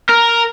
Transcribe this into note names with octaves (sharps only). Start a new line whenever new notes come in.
A#4